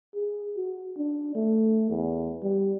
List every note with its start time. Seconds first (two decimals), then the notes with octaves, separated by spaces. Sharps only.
0.15 G#4
0.57 F#4
0.97 D4
1.35 A3
1.90 E2
2.43 G3